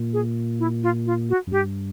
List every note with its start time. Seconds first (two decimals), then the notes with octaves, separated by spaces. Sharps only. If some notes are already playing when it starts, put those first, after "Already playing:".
Already playing: A#2
0.13 G#4
0.59 E4
0.83 F4
1.06 F4
1.29 F#4
1.47 F#2
1.52 G2 G4